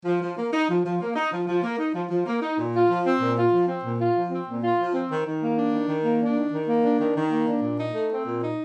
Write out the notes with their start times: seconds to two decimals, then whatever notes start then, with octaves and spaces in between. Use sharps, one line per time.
0.05 F3
0.22 F3
0.37 A#3
0.53 D#4
0.69 F3
0.85 F3
1.01 A#3
1.15 D#4
1.32 F3
1.47 F3
1.63 A#3
1.79 D#4
1.95 F3
2.10 F3
2.26 A#3
2.42 D#4
2.58 A#2
2.74 F4
2.89 F3
3.05 C4
3.21 A#2
3.37 F4
3.53 F3
3.68 C4
3.84 A#2
3.99 F4
4.16 F3
4.31 C4
4.47 A#2
4.63 F4
4.79 F3
4.94 C4
5.11 D#3
5.27 D#3
5.42 A#3
5.57 D4
5.73 D#3
5.89 D#3
6.04 A#3
6.20 D4
6.36 D#3
6.52 D#3
6.68 A#3
6.83 D4
7.00 D#3
7.16 D#3
7.31 A#3
7.48 D4
7.63 A#2
7.79 D#4
7.94 A3
8.11 C4
8.26 A#2
8.41 D#4